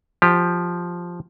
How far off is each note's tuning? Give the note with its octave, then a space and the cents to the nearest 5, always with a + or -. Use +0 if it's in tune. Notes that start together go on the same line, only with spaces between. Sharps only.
F3 +0 G4 +5